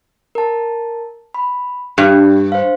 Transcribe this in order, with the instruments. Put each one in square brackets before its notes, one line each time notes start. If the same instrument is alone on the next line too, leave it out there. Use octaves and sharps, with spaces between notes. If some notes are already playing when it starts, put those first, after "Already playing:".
[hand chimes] A#4 A5
B5
[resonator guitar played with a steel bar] G2 [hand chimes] G4
[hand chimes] C5 F5